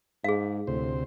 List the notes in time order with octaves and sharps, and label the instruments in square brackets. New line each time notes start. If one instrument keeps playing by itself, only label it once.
[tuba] G#2 [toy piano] G#4 F5
[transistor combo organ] D2 C3 C5 [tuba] A2